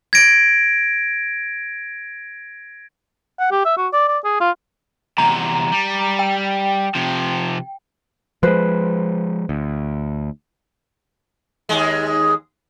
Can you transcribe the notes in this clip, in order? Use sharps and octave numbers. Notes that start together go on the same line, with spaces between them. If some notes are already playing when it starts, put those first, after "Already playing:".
G#6 A#6 D7
F#5
G4
E5
F#4
D5
D5
G#4
F4
E2 C3 A#5
G3
G5
C3 F3
F3 G#3 B4 C5
D2
D#2 G#3